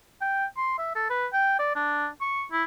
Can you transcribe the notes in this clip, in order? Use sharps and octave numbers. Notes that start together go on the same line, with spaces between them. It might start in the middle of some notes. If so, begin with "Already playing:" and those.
G5
C6
E5
A4
B4
G5
D5
D4
C#6
E4